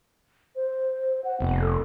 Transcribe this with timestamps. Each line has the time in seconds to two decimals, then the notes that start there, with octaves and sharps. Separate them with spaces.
0.56 C5
1.24 F#5
1.40 F1 B3
1.61 A4